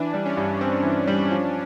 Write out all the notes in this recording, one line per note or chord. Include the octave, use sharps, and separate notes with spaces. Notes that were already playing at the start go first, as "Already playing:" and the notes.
Already playing: E3 D4
G3
C#4
G2
C4
E3
G3
F3